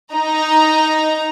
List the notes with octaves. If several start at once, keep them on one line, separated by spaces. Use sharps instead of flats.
D#4 A#5